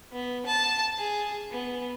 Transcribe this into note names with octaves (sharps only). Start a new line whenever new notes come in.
B3
A5
G#4
B3